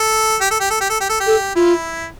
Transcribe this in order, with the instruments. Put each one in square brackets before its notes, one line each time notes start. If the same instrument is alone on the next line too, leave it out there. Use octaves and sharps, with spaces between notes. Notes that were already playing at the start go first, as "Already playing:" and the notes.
Already playing: [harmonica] A4
G4
A4
G4
A4
G4
A4
G4
A4
G4
[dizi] A4
[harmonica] E4 [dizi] F4